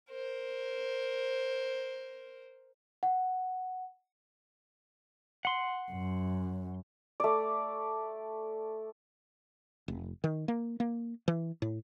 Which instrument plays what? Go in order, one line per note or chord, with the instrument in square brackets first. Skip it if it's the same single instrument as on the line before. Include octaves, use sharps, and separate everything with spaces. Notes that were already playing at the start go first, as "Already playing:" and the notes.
[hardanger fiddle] A#4 C5
[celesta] F#5
[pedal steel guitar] F#5 C6
[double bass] F#2
[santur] A3 D5
[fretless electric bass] F1
D#3
A#3
A#3
E3
A2